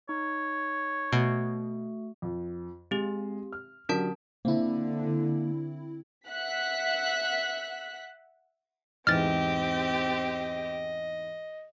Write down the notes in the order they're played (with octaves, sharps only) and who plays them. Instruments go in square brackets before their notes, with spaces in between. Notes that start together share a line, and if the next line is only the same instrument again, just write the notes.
[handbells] D#4 [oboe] C#5
[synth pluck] B2 [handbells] A3 F#4
[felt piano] F2
[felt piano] G#3 [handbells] C4 G4
[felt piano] F6
[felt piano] D3 F#3 G4 [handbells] C#4 A#4 A5
[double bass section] D3 [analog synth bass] A#3 [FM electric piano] C4 E4
[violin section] E5 F#5 F#6 B6
[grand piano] E2 G#2 E3 [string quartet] C4 G4 [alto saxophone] D#5 [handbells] F6 A6